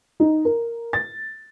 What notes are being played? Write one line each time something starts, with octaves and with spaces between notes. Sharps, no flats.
D#4
A#4
A6